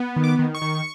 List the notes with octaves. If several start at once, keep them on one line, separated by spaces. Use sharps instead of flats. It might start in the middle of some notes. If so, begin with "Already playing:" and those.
Already playing: B3
D#3
D6
D#3
C#6
D#3